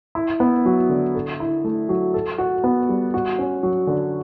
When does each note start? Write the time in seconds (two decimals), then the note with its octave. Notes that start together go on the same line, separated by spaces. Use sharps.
0.15 E4
0.40 B3
0.66 F#3
0.89 D3
1.15 A4
1.40 E4
1.65 A3
1.89 F#3
2.14 A4
2.38 F#4
2.64 B3
2.89 G3
3.14 F#4
3.39 C#4
3.63 F#3
3.87 D3